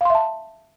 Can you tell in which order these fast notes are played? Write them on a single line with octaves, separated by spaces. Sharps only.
F5 C6 E5 A5